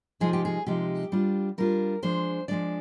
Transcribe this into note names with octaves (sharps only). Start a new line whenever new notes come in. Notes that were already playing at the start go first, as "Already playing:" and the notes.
C3 F3 G#3 D#4 G#4
G4
G#4
C3 F3 G#3 D#4 G4
G3 D4 F4
G3 D4 F4 A#4
F3 G#3 D4 C5
F3 G#3 D4 D5